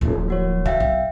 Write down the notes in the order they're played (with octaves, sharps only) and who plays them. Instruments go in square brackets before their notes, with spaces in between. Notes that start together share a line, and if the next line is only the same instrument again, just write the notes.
[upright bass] D1 F3
[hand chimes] A#3 F#4 C#5
[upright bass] D3 [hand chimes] E5 F5 G5
[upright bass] B1